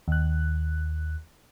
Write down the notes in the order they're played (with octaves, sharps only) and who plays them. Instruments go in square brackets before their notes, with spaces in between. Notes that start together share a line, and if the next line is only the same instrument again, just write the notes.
[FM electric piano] D#2 F#6